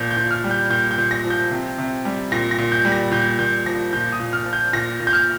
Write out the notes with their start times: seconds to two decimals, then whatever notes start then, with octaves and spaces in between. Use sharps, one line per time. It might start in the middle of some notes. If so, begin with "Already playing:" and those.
Already playing: A#2 F3 G6
0.11 G6
0.17 A#2
0.31 F6
0.44 G3
0.51 G6
0.70 A#2 G6
0.91 G6
0.98 A#2
1.11 A#6
1.24 F3
1.30 G6
1.51 C3
1.78 C3
2.05 G3
2.32 A#2 A#6
2.51 A#6
2.58 A#2
2.72 G6
2.85 G3
2.92 A#6
3.11 A#2 G6
3.39 A#2 G6
3.66 F3 A#6
3.93 A#2 G6
4.12 D#6
4.20 A#2
4.33 F6
4.46 F3
4.53 G6
4.73 A#2 A#6
5.00 A#2
5.07 G6
5.13 F6